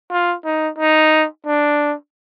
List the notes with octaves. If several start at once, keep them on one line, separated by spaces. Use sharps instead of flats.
F4
D#4
D#4
D4